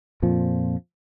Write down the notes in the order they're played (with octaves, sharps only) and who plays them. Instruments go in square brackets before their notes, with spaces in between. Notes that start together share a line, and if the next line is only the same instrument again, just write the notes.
[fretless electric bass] F2 A#2 F3